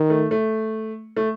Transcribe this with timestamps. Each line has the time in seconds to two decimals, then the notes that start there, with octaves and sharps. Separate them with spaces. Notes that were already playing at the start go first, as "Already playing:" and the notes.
Already playing: D#3
0.10 A3
0.31 A3
1.17 A3